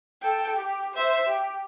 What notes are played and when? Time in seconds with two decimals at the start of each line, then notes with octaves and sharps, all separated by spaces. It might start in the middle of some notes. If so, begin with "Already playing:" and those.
0.21 A4 G5
0.57 G4
0.94 C5 E5
1.27 G4